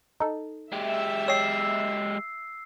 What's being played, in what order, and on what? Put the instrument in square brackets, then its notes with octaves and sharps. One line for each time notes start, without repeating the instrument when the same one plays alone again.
[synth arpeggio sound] D#4 A4
[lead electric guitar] G#3 G4 [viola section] E5
[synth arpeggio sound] C#5 D#5 G5 [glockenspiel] E6 C7